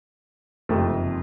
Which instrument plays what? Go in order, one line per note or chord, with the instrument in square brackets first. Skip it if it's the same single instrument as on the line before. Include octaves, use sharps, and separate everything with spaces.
[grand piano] F#1 F2 C3 D#3 G3 [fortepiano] A3